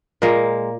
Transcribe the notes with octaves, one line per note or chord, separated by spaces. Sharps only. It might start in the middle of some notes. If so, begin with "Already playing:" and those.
A#2 G#3 A#3